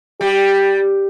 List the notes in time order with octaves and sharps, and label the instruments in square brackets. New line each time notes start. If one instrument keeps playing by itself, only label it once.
[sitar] G3 [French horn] G4